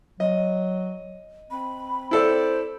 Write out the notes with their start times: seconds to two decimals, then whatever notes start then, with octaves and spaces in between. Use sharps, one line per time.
0.20 F#3 D#5
1.51 C4 B5
2.11 E4 A4 C5 D5